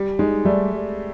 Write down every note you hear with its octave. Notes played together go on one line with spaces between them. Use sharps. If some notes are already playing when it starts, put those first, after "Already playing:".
Already playing: G3
G#3 D#4
G3 A3